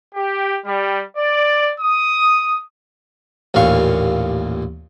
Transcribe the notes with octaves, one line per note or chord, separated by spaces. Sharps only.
G4
G3
D5
D#6
A1 D#2 A#2 F5 C#6